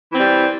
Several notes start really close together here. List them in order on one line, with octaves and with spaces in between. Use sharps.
E3 C4 G3